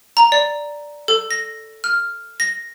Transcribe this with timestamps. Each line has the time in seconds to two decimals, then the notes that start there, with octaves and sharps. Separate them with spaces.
0.17 A#5
0.32 D5
1.08 A4
1.31 A#6
1.84 F6
2.40 A#6